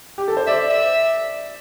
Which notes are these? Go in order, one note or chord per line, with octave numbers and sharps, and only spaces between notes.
G4
A4
C5
D5 E5
E5